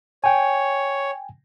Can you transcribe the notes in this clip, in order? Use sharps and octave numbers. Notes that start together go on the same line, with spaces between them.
C#5 G5 G#5